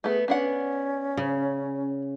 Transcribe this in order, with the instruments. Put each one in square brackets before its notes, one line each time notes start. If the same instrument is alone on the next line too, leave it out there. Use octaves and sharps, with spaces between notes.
[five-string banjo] A3 B3 [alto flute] G#4
[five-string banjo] B3 D4 F#5 [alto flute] C#4
[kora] C#3